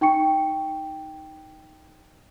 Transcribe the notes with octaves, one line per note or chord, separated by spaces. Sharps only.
D#4 G5 C#6 C#7